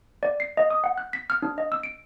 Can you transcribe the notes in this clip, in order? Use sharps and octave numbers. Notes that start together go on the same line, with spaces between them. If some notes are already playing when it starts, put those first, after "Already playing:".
D5
C7
D#5
D#6
F#5
F#6
B6
F6
D4
D#5
E6
D7